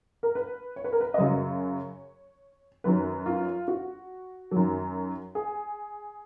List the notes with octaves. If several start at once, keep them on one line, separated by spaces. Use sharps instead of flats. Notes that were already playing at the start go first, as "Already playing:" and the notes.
A#4
B4
C#5
B4
A#4
B4
D#5
F#2 C#3 F#3 C#5
F#2 D#3 F#3 B4
F4
F#4
F#2 D#3 F#3
G#4